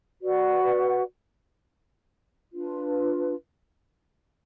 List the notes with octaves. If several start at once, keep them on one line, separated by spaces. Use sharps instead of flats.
F#4 B4 D5 F#5
D4 F4 B4